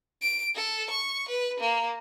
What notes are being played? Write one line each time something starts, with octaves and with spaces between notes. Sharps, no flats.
D7
A4
C#6
B4
A#3